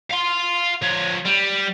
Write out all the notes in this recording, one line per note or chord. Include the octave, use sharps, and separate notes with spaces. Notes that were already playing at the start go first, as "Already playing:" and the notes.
F5 C6
F3 C#5
G3